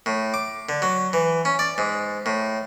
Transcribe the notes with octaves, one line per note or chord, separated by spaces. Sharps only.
A2
D6
D3
F#3
E3
C#4
D5
G#2
A2